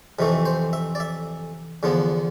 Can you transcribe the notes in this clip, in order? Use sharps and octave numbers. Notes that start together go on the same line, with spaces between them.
F2 C3 E3 A3
C5
E5
D5
E5
E2 D3 F3 B3